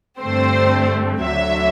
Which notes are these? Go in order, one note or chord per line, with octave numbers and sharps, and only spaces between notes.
G2 D3 A3 C4 C5
D2 D3 F#3 E5